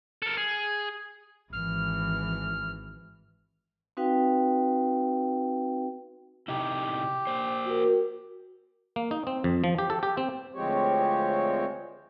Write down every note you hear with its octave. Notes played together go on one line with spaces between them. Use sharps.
A4 A#4
G#4
G#1 E3 F6
C4 D#4 F#4 B4 F5 G5
C3 D#4 E4 G4
A#3 C5
F#4 A#4
A#3
D#4
C4
F2
F3
G4
A4
G4
C4
D2 F3 G#3 C4 G4 C#5